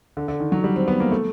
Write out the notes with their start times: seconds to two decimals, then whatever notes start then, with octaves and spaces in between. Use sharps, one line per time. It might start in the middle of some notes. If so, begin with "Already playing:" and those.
0.17 D3
0.28 D3
0.40 D#3
0.52 F#3
0.64 G3
0.76 C4
0.88 B3
1.00 A#3
1.12 A3